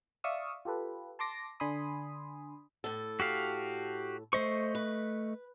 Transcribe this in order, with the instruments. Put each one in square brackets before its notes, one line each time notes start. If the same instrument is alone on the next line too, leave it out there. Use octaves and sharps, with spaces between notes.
[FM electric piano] D5 E5 F5 C#6 D#6 E6
F4 G4 A4 B4
A5 C6 D6 A#6
D3 D4 G#5 B5 C6 D#6
[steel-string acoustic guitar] A2 A4
[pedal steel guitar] F#4 G4 F5
[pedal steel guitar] A3 D#5 C#6 [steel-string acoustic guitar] C5
[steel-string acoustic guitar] B4